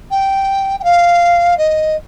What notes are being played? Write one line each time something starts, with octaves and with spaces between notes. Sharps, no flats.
G5
G5
F5
D#5